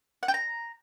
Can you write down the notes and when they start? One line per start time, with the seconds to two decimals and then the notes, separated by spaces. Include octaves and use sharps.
0.23 F#5
0.28 G5
0.34 A#5